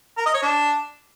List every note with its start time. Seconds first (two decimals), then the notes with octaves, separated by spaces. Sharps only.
0.18 A#4
0.26 D#5
0.34 C#5
0.42 D4